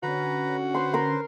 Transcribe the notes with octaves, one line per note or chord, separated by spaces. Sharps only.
D3 C#4 F#4 B4 A#5
B4 C5 C6
A#4 C6